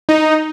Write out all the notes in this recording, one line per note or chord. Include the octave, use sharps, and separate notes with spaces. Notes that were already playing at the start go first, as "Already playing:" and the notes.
D#4